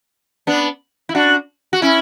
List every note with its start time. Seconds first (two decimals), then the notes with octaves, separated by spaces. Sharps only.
0.47 B3 D4
1.09 E4
1.15 D4 F#4
1.73 F#4
1.82 C#4 E4